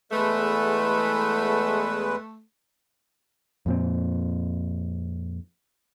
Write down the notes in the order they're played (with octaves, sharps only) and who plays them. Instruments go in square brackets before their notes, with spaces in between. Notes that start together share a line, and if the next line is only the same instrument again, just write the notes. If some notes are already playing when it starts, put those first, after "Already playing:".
[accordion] E2 G#3 B4 [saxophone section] A3
[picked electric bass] F2 A#2 C4